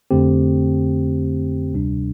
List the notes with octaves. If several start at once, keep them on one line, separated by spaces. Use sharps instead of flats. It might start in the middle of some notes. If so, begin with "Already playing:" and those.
F2 D3 A3 C4 G4
D2 C3 G3 D4